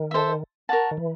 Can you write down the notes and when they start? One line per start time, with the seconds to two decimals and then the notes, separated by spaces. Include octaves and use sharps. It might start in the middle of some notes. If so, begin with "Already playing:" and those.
Already playing: D#3
0.11 A4 C5 E5
0.69 A#4 C#5 F#5 A5
0.91 D#3
0.97 E3